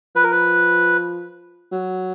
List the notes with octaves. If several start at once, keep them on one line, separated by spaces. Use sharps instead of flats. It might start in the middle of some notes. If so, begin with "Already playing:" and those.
F3 B4
A#4
B4
F#3